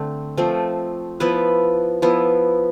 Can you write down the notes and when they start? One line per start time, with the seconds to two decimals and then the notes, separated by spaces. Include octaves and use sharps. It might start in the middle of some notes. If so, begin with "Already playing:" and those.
Already playing: D3 A3 C4
0.37 F3 A3 C4
1.20 F3 B3 E4 B4
2.02 F3 B3 E4